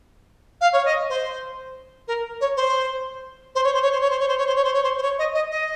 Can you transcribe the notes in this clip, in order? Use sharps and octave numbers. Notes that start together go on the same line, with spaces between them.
F5
C#5
D#5
C5
A#4
C#5
C5
C5
C#5
C5
C#5
C5
C#5
C5
C#5
C5
C#5
C5
C#5
C5
C#5
C5
C5
C#5
D#5
D#5
D#5